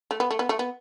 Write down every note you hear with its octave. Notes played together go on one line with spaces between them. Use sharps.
A3
B3
A3
B3
A3
B3